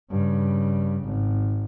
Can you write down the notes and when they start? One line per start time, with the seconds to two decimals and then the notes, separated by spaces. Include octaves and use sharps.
0.10 G2 C#3
1.05 G#1